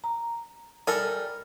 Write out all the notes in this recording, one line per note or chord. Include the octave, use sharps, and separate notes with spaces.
A#5
G3 A4 A#4 G#5